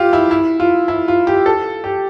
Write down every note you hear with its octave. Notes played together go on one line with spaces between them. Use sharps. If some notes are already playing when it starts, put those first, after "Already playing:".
Already playing: F4 G4
E4
E4
F4
E4
F4
G4
A4
G4